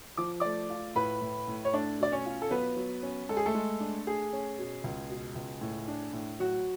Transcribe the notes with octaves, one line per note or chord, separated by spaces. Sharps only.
F3 D6
A3 D5 D6
F4
A2 B4 B5
A2
A2
C#5
A3 D4 D5
B2 D5
C#4 C#5
F4
A4
F#3 B3 B4
F#3
C#4
G#3 A4
G#4
A3 A4
G#3
D4
A3 G#4
C#4
B2
C#2
B2
C#2
A2
D4
A2
F#3 F#4